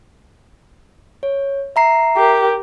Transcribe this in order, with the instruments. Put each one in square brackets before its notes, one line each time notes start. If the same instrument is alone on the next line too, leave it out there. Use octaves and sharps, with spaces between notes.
[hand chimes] C#5
E5 A#5 C7
[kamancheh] G4 A#4